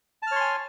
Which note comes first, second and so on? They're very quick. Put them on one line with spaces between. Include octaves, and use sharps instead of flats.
A5 F6 C#5 C6 G#5